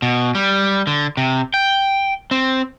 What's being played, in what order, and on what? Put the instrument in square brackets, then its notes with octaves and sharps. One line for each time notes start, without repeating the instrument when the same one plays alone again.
[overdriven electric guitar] B2
G3
D3
C3
G5
C4